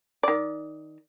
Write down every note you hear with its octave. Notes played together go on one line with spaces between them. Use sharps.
D#3 D5